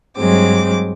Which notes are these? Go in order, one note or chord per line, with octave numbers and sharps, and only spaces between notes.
G2 F#3 G#3 C4 D6